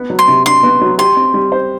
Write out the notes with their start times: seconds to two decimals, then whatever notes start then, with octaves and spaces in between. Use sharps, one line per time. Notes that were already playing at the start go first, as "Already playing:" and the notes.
Already playing: B3
0.10 F#3
0.19 C6
0.28 C3
0.45 D4 C6
0.63 B3
0.81 F#3
0.98 G4 C6
1.16 C4
1.34 G3
1.52 C5